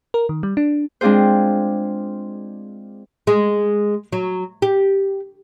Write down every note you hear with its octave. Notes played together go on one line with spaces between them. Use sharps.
A#4
D#3
G3
D4
G#3 C4 D4 F4 G#4 C5
G#3
F#3
G4